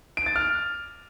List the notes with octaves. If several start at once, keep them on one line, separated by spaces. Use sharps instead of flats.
D7
A6
F6